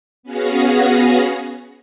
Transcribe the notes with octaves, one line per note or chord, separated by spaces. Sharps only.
B3 C#4 F#4 G#4 F5 A#6